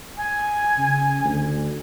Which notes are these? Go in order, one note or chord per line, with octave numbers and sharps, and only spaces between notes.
G#5
C#3
D2